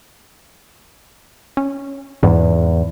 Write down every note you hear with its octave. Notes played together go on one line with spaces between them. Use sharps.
C#4
E2 G#2